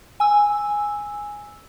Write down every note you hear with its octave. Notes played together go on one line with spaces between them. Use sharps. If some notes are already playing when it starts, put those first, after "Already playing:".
G#5 E6